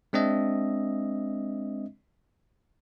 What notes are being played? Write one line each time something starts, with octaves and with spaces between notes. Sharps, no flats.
G#3 C4 D4 D#5 E5